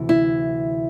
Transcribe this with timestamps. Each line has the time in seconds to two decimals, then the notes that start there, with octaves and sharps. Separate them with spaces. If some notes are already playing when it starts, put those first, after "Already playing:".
Already playing: D2 C3 E3
0.09 E4